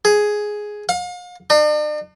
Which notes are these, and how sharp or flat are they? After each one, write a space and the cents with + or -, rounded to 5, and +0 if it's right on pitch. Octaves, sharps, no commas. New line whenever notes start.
G#4 +5
F5 +40
D4 +45